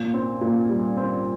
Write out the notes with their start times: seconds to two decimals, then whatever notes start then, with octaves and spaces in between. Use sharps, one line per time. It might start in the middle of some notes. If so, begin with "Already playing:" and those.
Already playing: A#2
0.14 C4
0.41 A#2
0.69 G3
0.97 C4